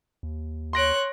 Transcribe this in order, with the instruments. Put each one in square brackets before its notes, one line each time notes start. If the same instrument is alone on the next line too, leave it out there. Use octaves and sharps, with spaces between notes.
[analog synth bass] D#2
[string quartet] C#5 F#6 [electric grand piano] C6 A#6 D7